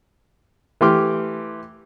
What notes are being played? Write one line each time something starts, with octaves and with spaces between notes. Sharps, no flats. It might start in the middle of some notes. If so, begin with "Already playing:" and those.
E3 A3 G4 C6 D6 F6